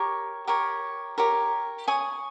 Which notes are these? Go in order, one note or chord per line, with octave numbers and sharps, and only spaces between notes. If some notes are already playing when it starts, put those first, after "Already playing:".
Already playing: G4 A#4 C#5
G4 A#4 C#5
G4 A#4 C#5
C#5 G#5 D#6